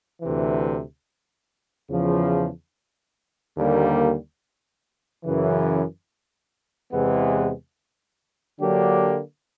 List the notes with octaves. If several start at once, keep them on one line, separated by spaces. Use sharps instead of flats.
D2 C3 E3
E2 C#3 F3
D#2 D3 G3 A#3
F#2 C#3 E3
E2 C3 E3 G#3 B3
D3 F#3 A#3 D4 G4